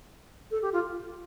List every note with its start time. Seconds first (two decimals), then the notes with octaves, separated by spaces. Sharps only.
0.51 A4
0.62 G4
0.73 F4